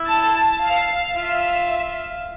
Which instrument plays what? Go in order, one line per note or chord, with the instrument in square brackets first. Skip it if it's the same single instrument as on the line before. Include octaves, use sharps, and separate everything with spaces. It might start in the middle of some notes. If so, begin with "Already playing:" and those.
Already playing: [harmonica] E4 E5
[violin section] A5
F5
[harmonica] F4 F5 [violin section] E5